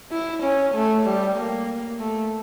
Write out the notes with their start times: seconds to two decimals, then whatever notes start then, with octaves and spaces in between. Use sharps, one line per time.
0.11 E4
0.43 C#4
0.74 A3
1.06 G3
1.37 A#3
1.99 A3